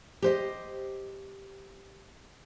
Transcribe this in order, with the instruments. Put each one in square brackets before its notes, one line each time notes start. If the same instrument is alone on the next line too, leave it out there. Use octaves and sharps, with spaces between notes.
[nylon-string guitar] G4 C5 D#5